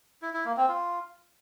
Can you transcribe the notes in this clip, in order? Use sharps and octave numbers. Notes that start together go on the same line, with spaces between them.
E4
E4
A#3
C4
F4